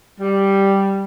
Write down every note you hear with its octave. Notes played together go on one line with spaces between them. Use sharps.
G3